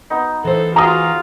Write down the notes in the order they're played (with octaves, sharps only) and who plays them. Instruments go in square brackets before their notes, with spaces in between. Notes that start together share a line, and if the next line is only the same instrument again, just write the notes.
[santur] B3 D#4
[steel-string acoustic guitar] E3 C5 [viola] A4
[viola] F4 [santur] F#4 G#4 [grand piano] A#5 D#6